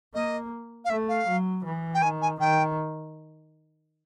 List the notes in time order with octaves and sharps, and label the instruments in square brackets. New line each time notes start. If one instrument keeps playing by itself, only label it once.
[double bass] A#3 [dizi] D#5
[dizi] F5
[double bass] A3 [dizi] E5
[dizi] F5
[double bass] F#3
E3
[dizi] G5
[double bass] D#3 [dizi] G#5
[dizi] G#5
[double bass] D#3 [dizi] G5